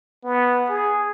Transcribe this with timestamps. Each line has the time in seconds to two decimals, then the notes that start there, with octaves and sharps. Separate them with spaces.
0.24 B3
0.69 G#4